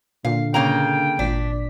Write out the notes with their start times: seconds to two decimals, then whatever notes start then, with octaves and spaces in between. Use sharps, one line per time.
0.25 A#2 D3 F5
0.54 C#3 A#3 G5 A#5
1.19 G#1 A#2 D4 B6